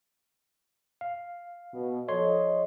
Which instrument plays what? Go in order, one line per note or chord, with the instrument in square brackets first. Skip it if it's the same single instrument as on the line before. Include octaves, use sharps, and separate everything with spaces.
[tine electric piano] F5
[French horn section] B2
[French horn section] F3 A4 D#5 [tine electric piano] C#5 C6